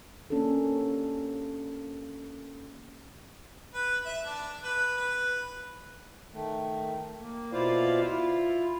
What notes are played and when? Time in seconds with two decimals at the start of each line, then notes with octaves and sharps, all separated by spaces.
0.30 A#3 C#4 D4 G4 A4
3.74 B4
4.06 E5
4.26 D4
4.64 B4
4.97 B4
6.33 D#3 A3
7.20 A#3
7.53 B2 E4 F4 C5 D5 F5
8.02 E4 F4